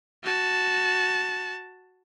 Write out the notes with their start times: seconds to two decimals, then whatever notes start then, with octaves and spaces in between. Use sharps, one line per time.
0.24 F#4 A5